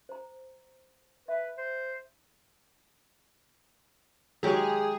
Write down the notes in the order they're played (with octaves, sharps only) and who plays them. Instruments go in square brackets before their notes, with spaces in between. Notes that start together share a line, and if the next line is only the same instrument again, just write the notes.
[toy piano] C5 A#5
[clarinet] B4 [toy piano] E5
[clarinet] C5
[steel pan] D#3 F#3 C#5 [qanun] G#3 G4 A#5 [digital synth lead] G#4